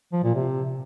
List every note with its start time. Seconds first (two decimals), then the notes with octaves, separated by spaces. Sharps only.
0.13 F3
0.24 A#2
0.35 C3